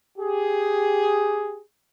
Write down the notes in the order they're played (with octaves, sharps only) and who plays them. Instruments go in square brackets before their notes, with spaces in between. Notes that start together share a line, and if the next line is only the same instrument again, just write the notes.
[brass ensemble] G4 G#4